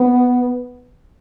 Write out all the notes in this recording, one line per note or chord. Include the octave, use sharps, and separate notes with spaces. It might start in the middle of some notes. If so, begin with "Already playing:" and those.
Already playing: B3